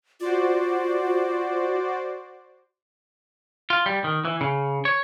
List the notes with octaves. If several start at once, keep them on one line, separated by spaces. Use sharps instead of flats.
F4 F#4 C5 D5
F4
G3
D#3
E3
C#3
C#5